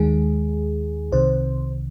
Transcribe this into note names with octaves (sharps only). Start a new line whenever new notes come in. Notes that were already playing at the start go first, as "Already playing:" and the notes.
Already playing: D#2 D#3 G#3 G#4
C2 C3 D#3 C5